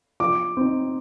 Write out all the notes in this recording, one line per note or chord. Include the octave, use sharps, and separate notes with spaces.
F3 D6
C4 D#4